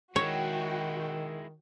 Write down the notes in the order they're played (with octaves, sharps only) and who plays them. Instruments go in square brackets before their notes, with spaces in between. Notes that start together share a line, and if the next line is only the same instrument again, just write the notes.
[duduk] D#3 [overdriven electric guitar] G#3 E4 [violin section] F#4 G5 [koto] C#5